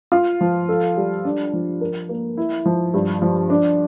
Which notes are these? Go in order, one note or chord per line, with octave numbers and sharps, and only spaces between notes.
F4
F3
A4
G3
D4
F3
A#4
A#3
E4
F3
G2
F3
D4